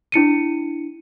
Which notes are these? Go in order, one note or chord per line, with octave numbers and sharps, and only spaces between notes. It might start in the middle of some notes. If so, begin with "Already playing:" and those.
D4 E4 C#7 D#7